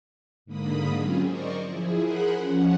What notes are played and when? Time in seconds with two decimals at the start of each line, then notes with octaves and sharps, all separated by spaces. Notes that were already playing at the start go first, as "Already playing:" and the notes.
0.46 G#2 D3 A#3 B5 D#6
0.94 F#3 C4 C#4 F4 G#4
1.29 A#4 C5 D5 D#5 C#6
1.63 F3 E4 G#4
2.01 G#4 A#4 C5 F#5 B5 F#6
2.36 F3 C#4 F#5